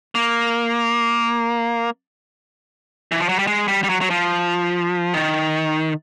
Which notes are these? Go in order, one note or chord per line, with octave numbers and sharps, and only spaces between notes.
A#3
E3
F3
F#3
G3
G#3
G3
G3
F#3
F#3
F3
D#3